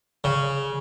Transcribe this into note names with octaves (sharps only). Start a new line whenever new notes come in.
C#3